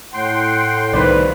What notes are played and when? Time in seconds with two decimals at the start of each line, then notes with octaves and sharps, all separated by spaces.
0.14 A2 F#5 G5 C6
0.93 C2 D#3 B4 C5 D5